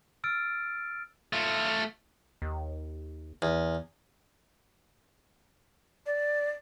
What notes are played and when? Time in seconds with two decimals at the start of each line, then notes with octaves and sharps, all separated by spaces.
0.24 E6 F6 A6 D7
1.33 A3 F4
2.42 D#2
3.42 E2
6.06 D5